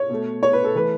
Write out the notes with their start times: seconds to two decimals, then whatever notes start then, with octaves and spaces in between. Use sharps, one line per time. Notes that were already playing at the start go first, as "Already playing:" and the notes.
Already playing: C#5
0.10 B2 A3
0.43 C#5
0.53 B4
0.65 A4
0.75 E3 A3 B4